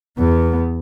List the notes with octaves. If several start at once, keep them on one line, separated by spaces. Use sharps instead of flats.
E2 B3